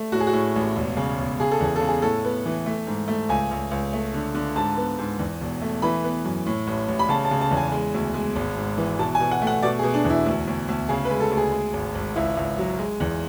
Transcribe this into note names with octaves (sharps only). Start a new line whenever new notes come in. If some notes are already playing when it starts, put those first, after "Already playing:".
Already playing: A3
A2 F#4
G#4
F#4
A2
A1
E1
C#3
E1
C#3 G#4
A4
E2 G#4
A4
C#3
G#4
A2 A4
B3
E3
A3
G#2
A3
C#2 G#5
C#2
C#2
A3
D3
D3
G#2 A5
B3
G#2
E2
E1
A3
E3 B5
B3
F#2
A2
A1
A1
B5
C#3 A5
A5
C#3
A5
E2
G#5
G#3
D2
G#3
G#1
G#2
E3
B2 A5
G#5
B2
F#5
A3
F#5
B2 D5
G#4
B2
D4
E2
E4
D2
D2
D2
C#3 G#4
B4
G#3
A4
D2
G#4
G#3
G#1
G#1
C#2 E4
C#2
F#3
G#3
E2